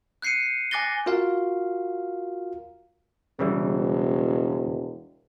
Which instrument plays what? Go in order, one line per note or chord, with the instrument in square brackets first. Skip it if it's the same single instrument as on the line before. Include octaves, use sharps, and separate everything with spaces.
[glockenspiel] F#6 G6 C7 C#7 D#7
G#5 D6 F#6 A6 A#6 G7
[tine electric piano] F4 F#4 A#4 F5
[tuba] E1 [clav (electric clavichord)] C#3 E3 G3